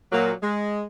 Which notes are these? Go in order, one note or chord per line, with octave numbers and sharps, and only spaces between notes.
A#2 F#3 A#3
G#3